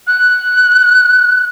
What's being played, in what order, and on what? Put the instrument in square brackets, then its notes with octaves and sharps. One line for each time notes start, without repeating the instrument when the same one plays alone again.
[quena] F#6